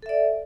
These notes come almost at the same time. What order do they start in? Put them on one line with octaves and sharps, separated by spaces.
A4 E5 D5